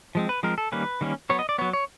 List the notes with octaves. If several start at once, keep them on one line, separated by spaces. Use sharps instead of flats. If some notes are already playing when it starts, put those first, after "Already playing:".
F3 G#3 C4
B4
F3 G#3 C4 A#4
A4
D#3 G3 A#3 C#4 B4
D#3 G3 A#3 C#4
F#3 B3 C#5
D#5
D5
F#3 B3 C#5
C#5